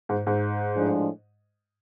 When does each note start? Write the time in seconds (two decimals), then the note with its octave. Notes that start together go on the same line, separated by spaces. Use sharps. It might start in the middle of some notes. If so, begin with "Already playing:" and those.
0.09 G#2
0.27 G#2
0.75 A2 F3 G#3 D4